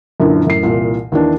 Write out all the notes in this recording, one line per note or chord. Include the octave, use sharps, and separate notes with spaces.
F#2 A#2 D3 E3
F#2 A2 C7
C2 A#2 E3
D#2 E3 D4